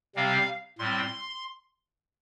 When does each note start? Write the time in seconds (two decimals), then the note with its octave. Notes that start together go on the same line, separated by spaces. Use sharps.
0.16 C3 G3 C4 F5
0.79 A2 G3 C4 C6